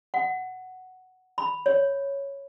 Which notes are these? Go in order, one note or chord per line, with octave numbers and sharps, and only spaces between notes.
F#5
B5
C#5